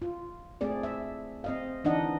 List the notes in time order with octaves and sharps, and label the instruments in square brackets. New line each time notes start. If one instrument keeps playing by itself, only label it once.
[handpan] F4
A3 C4 G#4 D5
E5
C4 D#5 F5
E3 D4 D#4 D#5 F#5